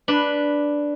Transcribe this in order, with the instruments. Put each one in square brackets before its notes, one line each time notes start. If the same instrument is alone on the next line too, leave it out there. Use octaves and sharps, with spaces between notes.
[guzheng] D4 B4